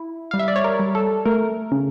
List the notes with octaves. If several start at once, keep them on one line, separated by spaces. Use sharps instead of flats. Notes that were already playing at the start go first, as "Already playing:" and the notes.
Already playing: E4
G3 F5
E5
D5
C#5
A#4
G3
A4
A3 A#4
C#3